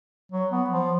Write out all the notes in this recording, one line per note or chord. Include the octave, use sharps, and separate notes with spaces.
F#3
B3
F3